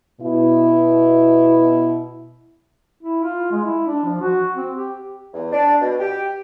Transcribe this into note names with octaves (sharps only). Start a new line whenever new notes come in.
B2 E4
E4
F4
G#3
E4
D4
F3
F#4
C4
G4
E2
D4
B2
G4